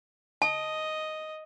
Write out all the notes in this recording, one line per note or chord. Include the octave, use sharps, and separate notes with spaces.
D#5 A5